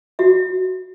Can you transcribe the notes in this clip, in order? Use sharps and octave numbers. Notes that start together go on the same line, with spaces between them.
F#4 E5